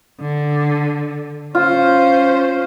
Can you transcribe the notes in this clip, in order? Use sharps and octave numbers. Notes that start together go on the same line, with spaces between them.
D3
C#4 F4 C5